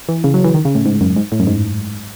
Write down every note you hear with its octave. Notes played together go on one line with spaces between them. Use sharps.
E3
C#3
F#3
E3
D#3
C#3
A2
G#2
F#2
G#2
A2
F#2
G#2